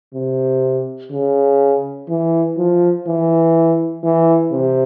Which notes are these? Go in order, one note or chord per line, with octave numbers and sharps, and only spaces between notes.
C3
C#3
E3
F3
E3
E3
C3